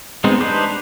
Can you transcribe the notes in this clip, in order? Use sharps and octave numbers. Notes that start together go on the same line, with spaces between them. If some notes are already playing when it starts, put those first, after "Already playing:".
G#3 B3 C4 D#4
D4 D#4 G4 B4 C5